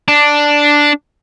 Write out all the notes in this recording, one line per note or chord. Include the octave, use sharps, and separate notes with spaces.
D4